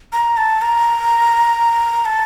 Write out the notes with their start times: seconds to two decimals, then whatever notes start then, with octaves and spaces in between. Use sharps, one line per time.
0.13 A#5
0.37 A5
0.62 A#5
2.05 A5